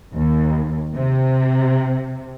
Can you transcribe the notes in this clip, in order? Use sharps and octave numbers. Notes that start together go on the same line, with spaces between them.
D#2
C3